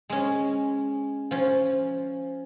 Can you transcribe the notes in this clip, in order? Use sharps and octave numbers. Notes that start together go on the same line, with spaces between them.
G#3 C#4
F3 C#4